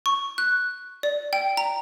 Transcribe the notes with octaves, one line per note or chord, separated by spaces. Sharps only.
C#6
F#6
D5
G5
A#5